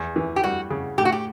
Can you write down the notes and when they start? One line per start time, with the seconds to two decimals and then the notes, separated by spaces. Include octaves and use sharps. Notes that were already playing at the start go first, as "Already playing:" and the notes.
Already playing: E2
0.16 E3
0.36 G4
0.43 G3 F#4
0.71 C#3
0.98 A2 G4
1.05 F#4
1.12 G4